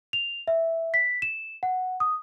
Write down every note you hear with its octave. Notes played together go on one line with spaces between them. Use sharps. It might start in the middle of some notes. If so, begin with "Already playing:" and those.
F7
E5
B6
E7
F#5
D#6